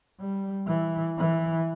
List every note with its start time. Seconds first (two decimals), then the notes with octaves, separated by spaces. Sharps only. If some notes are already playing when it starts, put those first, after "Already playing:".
0.20 G3
0.67 E3
1.18 E3